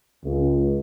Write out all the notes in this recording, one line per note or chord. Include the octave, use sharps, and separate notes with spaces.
C#2